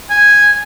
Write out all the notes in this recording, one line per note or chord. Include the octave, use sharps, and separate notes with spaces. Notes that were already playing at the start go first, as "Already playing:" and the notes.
G#5